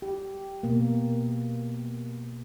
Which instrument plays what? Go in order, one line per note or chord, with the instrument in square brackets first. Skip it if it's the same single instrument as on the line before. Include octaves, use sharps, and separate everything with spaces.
[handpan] G4
B2 A#3